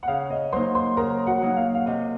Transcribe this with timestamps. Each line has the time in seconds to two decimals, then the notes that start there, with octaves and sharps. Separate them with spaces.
0.03 F#5
0.08 C#3 F5
0.30 D#5
0.52 F#3 A#3 D#4 C5 C6
0.75 C5 C6
0.97 C#3 A#4 A#5
1.27 F#4 F#5
1.42 F#3 A#3 D#4
1.57 F5
1.75 F5
1.86 C3 D#5